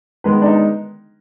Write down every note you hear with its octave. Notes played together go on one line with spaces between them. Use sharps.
D#3 G#3 B3 B4
D4
D#4